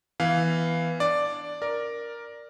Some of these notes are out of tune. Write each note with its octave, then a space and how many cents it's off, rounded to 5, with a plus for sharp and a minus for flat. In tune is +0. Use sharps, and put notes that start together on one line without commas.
E3 +0 B3 +0 F5 +5
D4 +0 D5 +0
A#4 +5 D5 +0